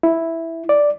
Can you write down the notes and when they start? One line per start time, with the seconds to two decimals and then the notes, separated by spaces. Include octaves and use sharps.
0.03 E4
0.69 D5